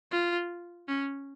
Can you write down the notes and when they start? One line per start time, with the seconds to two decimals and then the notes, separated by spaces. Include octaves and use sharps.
0.11 F4
0.88 C#4